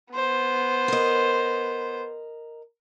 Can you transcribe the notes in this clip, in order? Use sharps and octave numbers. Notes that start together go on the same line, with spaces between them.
B3 C5
A#4 D#5